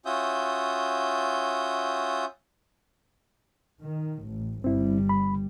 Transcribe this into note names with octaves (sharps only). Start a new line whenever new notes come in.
C#4 F4 F#4 E5 D#6 G6
D#3
A1
G1 G3 C4 E4
B5